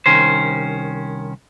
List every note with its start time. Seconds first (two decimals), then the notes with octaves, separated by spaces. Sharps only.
0.06 C2 D#3 C#4 C5